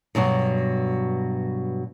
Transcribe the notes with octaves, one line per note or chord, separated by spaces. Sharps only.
G2 B2 F#3 F#4